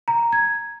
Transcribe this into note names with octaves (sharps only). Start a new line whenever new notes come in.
A#5
G#6